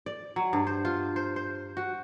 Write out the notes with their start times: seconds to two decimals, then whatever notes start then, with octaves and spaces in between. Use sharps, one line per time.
0.06 D5
0.36 F#3
0.53 G2
0.67 C5
0.85 F4
1.16 C5
1.36 C5
1.77 F#4